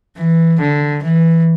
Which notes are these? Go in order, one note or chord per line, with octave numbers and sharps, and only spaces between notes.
E3
D3
E3